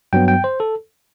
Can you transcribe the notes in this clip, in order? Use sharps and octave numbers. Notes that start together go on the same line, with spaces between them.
G2 F#3 B3 G5
G5
C5
A4